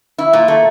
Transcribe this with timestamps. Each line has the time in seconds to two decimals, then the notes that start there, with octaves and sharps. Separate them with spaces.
0.18 E4
0.33 A#2
0.48 A3